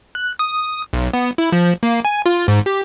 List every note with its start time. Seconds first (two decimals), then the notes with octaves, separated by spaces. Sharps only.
0.15 F#6
0.39 D#6
0.93 B1
1.13 B3
1.38 E4
1.52 F3
1.83 A#3
2.05 G#5
2.26 F4
2.48 G#2
2.66 G4